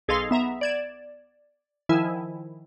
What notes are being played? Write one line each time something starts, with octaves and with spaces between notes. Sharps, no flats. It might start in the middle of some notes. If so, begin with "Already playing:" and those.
B1 G#4 A4 D#5 F5 C6
B3 E5 A#5
D5 G#6 E7
D#3 F3 E4 E5 G#5